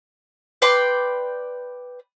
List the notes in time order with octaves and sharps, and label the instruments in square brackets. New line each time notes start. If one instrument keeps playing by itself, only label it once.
[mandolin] B4 D5 G5 C6